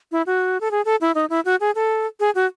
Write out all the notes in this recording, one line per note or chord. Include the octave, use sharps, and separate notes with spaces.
E4
F#4
A4
G#4
A4
E4
D#4
E4
F#4
G#4
A4
G#4
F#4